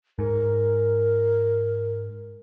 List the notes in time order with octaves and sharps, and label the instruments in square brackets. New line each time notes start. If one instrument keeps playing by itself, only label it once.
[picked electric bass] G#2 [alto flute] A#4